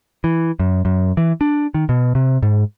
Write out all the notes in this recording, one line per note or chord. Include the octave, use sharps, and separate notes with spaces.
E3
F#2
F#2
E3
D4
D#3
B2
C3
G#2